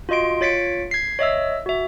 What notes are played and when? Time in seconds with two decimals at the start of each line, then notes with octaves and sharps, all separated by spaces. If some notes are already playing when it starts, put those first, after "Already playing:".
0.09 F4 F#4 D#5 C6 D7
0.41 F4 C#5 A6 B6 C#7 D7
0.91 G#6 B6 C7
1.19 C#5 D#5 E5 E6
1.66 F#4 E5